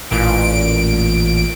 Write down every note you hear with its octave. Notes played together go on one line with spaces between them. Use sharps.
A1 A#2 D7